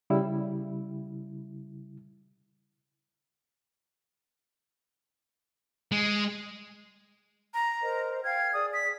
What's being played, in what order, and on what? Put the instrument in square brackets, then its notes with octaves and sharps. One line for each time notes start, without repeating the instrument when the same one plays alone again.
[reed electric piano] C#3 G3 E4
[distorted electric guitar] G#3
[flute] A#5
[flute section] A#4 C5 D#5
[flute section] F5 G5 F6 [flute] G#6
[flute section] G#4 D5 [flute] D#6
[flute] B6